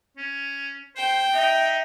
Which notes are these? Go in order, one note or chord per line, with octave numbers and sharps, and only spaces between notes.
C#4
C5 G5
D#4 E5